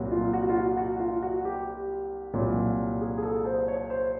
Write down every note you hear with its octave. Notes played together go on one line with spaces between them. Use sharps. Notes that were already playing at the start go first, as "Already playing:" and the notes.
Already playing: C2 A#2 F#3
F4
F#4
F4
F#4
F#4
F4
F#4
G4
C2 A#2 F#3
G#4
G#4
A4
C5
C#5
C5